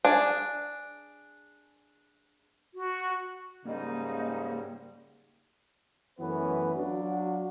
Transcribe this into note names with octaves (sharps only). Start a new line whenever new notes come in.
D4 G#4
F#4
G#2 C#3 G3 A#3 D#4
F#2 E3 A3 B3 C#4 B4
F#3 D4 F4 F#4